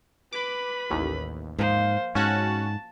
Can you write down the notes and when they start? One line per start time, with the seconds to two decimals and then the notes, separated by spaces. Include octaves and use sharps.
0.33 B4 B5 D6
0.90 A1 D#2
1.59 G#2 F3 A#3 C5
2.15 G#2 C#4 F#4 A5 F#6